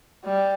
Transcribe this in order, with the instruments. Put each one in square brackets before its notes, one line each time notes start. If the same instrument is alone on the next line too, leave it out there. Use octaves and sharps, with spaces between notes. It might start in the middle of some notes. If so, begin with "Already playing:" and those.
[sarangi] G3